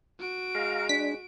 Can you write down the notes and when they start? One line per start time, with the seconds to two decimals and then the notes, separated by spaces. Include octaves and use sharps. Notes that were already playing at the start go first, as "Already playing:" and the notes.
0.19 F#4 D7
0.55 G#3 F5 A#5
0.89 D4 B6